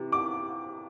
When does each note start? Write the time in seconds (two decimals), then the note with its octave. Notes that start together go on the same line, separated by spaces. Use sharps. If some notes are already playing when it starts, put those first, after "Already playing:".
Already playing: C3 E3
0.12 D6